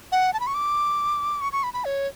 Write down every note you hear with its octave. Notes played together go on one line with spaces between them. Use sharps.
F#5
A5
B5
C#6
D6
C#6
C#6
B5
B5
C#5